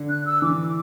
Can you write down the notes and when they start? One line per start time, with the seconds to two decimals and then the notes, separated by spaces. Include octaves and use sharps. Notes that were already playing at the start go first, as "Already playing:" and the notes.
Already playing: D3
0.10 F#6
0.26 E6
0.42 E3 D6